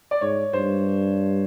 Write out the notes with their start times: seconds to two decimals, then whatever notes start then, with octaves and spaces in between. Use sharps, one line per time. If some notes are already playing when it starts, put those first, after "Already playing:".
0.11 D5
0.21 G#2 C#5
0.53 G2 C5